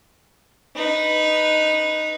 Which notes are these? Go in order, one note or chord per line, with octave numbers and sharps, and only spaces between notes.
D#4 B4